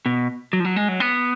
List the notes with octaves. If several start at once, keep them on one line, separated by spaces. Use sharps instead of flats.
B2
F#3
F3
F#3
G#3
F#3
B3